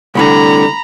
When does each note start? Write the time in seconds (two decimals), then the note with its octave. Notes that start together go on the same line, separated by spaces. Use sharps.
0.15 C2 A2 D3 A#5 B5